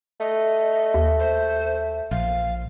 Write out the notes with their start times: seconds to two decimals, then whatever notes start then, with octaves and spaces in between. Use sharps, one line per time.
0.20 A3 D#5
0.94 D#2
1.20 C5
2.11 A#1 F5